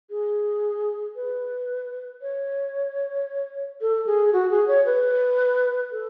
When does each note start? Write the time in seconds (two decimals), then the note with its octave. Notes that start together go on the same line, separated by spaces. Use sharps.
0.10 G#4
1.16 B4
2.22 C#5
3.81 A4
4.06 G#4
4.33 F#4
4.51 G#4
4.68 C#5
4.86 B4
5.92 A4